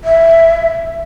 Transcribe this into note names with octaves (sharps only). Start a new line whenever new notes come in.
E5